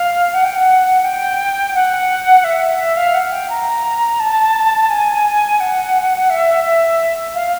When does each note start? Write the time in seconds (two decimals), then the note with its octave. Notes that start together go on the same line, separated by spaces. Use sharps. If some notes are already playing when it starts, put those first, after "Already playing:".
Already playing: F5
0.34 F#5
0.44 G5
0.55 F#5
1.04 G5
1.74 F#5
2.44 E5
2.79 E5
2.97 F5
3.14 F#5
3.31 G5
3.49 A#5
4.19 A5
4.89 G#5
5.60 F#5
6.30 E5
6.64 E5
7.34 F5